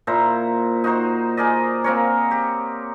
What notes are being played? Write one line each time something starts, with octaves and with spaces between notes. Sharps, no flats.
A#2 E4 C5 A#5
D#4 F#4 C5
G#4 A#4 D5 D#5
A#3 C4 A#4 C#5
G4